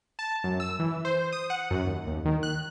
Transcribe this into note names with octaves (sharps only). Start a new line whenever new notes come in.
A5
F#2
E6
E3
C5
D#6
F#5
F#2
D#2
D#2
D#3
F#6